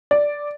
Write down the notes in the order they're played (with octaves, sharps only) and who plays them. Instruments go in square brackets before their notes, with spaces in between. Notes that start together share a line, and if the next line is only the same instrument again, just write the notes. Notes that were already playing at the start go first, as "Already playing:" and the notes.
[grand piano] D5